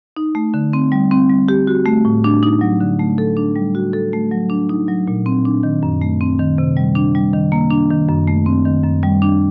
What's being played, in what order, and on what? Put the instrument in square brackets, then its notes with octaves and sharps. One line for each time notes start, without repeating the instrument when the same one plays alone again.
[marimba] D#4
A3
D3
C4
G3
C4
G3
G4
F#4
A3
A2
D4
D#4
F#3
D3
A3
A4
D4
G3
F#4
A4
A3
F#3
D4
D#4
F#3
A#2
C4
D4
D#3
F#2
A3
C4
D#3
C3
G3
D4
G3
D#3
A#3
D4
D#3
F#2
A3
C4
D#3
F#2
G3
D4